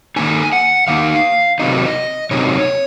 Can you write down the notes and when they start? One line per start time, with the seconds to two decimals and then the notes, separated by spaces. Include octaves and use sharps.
0.16 D#3 A#3 D#4 G#5
0.52 F#5
0.88 D#3 A#3 D#4 F5
1.59 C3 D#3 F#3 C4 D#4 D#5
2.31 C3 D#3 F#3 C4 D#4 C#5